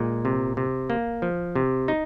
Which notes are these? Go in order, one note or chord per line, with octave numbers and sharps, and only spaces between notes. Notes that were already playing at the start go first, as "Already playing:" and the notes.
Already playing: A#2 G#3
C3
C3
A#3
F3
C3
D#4